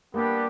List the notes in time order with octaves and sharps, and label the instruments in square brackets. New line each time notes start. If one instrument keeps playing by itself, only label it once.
[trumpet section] G3 B3 D4 G4 [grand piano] A#3